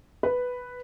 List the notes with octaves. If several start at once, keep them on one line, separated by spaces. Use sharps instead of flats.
B4